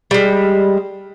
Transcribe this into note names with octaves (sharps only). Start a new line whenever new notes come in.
G3 G#3